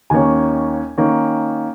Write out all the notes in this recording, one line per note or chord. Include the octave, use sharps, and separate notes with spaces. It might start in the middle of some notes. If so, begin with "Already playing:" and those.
D#2 D#3 A#3 C#4 G#5
D#3 A#3 C#4